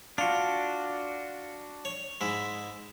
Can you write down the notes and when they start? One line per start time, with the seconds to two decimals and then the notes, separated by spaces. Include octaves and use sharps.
0.18 D4 F4 F#4
1.85 C#5
2.21 G#2 G#3 E4